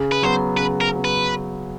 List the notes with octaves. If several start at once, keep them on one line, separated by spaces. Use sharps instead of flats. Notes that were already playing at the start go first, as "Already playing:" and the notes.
Already playing: C#3
B4
F#3 B3 C5
C#3 B4
A#4
F#3 B3
B4